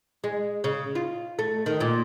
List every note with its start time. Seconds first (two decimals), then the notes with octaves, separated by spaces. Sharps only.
0.24 G#3
0.64 C#3
0.95 F4
1.39 A3
1.66 D#3
1.80 A#2